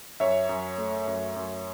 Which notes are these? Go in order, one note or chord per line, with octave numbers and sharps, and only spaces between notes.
F#2 C#5 E5
F#2
A3
F#2
F#2